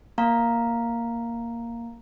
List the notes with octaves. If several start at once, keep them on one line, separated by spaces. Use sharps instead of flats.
A#3 F5 A#5